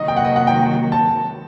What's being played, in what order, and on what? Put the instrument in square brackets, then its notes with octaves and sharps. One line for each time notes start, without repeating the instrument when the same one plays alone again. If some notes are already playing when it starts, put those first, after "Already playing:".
Already playing: [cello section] C3 D#3 F#3 A#3 F#4 [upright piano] D#5
[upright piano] G5
F#5
D#5
F#5
G5
A5